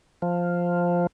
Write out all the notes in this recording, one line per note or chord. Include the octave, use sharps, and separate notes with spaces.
F3